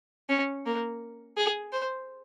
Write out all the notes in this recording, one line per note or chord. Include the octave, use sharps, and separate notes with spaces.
C#4
A#3
G#4
C5